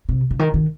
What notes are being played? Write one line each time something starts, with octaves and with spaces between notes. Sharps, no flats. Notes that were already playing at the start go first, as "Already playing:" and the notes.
C3
C#3
D#3
D#3